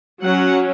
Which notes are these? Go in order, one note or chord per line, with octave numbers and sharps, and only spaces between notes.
F#3 C#4 F#5